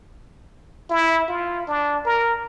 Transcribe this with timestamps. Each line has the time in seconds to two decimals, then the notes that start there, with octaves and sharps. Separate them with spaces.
0.90 E4
1.29 F4
1.67 D4
2.05 A#4